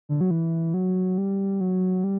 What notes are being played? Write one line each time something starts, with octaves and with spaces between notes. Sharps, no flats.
D3
F#3
E3
F#3
G3
F#3
G3